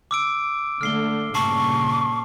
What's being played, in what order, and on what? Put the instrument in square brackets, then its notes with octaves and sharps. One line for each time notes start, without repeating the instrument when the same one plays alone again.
[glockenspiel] D6 E6 D7
[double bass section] D3 A3 [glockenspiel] F6 C7 G7
[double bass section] G2 A#2 C#3 [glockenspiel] A5 C7 F#7 [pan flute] C#6